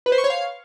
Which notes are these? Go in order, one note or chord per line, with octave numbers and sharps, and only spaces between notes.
B4
C5
C#6
C#5
F5